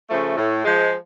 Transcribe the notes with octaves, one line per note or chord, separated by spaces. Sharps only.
C#3 F3 A3
A2
F3 G#3